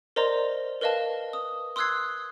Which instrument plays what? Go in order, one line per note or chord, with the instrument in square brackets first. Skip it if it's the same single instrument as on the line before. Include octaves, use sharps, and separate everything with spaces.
[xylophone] A#4 C5 D5 D#5 A#5 C6
A#4 B4 D#5 F5 A5
D#6
C6 D#6 E6 F#6 G#6 C7